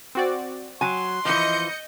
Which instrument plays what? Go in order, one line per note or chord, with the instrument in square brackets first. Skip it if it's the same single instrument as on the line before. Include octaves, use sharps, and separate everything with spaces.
[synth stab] C4 F#4 D5
[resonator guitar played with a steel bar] F#3 G#5 [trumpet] C6
[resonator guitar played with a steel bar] E3 F3 [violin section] D#5 G6 C#7